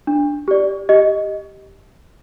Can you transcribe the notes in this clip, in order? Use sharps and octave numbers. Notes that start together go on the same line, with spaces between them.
D4
G4 D5
G4 D#5